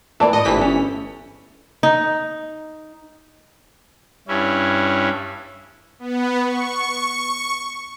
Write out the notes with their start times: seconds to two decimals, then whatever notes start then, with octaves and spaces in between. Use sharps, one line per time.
0.20 E3 A#3 D5 A5
0.33 A2 D#5
0.45 G1 E3 C5 B6
0.59 C#4 A4
1.83 D#4
4.28 G2 C#4 E4
5.99 B3
6.43 C#6